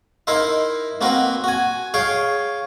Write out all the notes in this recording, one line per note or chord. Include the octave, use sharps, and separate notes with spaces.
D#4 E4 A#4 C5 E5
A#3 C4 F#4 A#4 B4
F#4 G#5
G#4 C#5 F5 G5